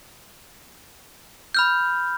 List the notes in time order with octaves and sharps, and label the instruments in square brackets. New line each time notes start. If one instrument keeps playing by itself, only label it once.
[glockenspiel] B5 F6 G6